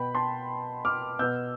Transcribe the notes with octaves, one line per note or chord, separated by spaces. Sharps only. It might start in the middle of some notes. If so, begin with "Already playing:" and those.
Already playing: B2 B3 G5 B5
A5 C6
D6 F6
B2 B3 E6 G6